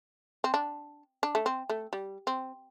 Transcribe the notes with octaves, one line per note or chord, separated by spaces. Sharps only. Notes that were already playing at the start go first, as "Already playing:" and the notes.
C4
D4
D4
A3
C4
A3
G3
C4